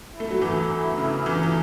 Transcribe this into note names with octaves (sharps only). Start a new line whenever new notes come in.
E4
A3
F#3
E2 E3
C#3
E2 E3
E3